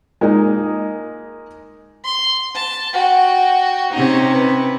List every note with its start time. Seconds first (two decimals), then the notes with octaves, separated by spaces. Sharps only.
0.21 G#3 A#3 D#4
2.04 C6
2.55 A5
2.93 F#4 G5
3.92 C3 C#4 D#4 C#5
4.32 B4